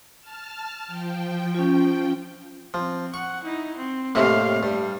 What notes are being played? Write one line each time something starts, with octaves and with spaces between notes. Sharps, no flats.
A5 F6
F3 G5
C#4 F4
F3 C4
F#5 C#6
D#4 E4
C4
D#2 A2 C3 C4 F5
G2 G3